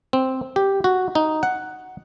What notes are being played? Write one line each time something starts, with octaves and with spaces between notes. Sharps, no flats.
C4
G4
F#4
D#4
F#5